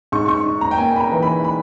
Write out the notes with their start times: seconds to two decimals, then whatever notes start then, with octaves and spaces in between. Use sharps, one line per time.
0.12 G#2 C#6
0.28 C#6
0.45 D#4
0.61 A#5
0.71 G5
0.78 A#3 G#5
0.96 B5
1.00 A#5
1.12 E3
1.22 B5
1.44 B5